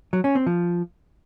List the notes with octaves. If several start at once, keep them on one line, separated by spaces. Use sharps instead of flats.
F#3
C#4
C4
F3